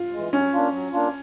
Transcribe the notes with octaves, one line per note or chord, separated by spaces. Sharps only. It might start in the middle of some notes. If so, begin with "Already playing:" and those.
Already playing: F4
E3 G#3
F#3 C#4
A#3 D4 F4
F#3
A#3 D4 F4